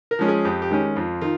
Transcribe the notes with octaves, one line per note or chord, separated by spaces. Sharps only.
A#4
F3 G#3 C#4
G#4
F2 G4
G4
D#3 G#3 C#4
F2 F4
D#3 F4